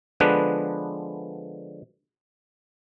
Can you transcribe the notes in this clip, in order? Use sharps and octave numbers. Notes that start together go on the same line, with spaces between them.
D3 F3 G#3 B3 D4 B4